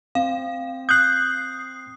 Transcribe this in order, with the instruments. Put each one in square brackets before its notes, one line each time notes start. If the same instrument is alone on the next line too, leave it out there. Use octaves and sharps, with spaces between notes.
[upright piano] C4 [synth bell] F5
[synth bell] D#6 C7 [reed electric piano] F#6 G6